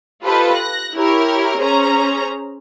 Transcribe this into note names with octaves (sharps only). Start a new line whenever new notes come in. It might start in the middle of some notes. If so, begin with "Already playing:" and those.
F4 G4 A4 B4 C5 D#5
F#6 A#6
E4 G4 A#4 C#5
C#4 G#4 C5 A#5